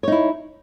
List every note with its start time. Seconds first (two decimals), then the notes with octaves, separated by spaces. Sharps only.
0.03 C#5
0.08 D#4
0.12 E4